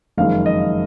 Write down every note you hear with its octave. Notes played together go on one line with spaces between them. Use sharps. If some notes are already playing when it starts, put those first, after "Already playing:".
F#1 F2 D#3 G#3 F5
D#5